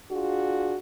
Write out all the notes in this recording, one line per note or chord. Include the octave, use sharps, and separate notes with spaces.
D4 F4 F#4 G#4